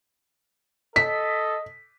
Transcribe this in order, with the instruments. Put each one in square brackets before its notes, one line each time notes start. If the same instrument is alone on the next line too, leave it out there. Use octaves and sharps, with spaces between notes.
[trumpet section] A4 D#5 [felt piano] B6